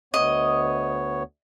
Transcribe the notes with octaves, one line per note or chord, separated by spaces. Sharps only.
D2 B3 C#5 D#5